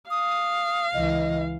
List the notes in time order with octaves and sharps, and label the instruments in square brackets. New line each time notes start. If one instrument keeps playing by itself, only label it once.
[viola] F5 [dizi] D#6
[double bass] C#2 E3 [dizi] D#5